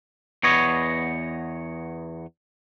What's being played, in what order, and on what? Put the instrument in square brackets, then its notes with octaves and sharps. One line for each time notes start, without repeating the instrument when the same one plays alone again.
[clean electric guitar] E2 B3 C#5 D#5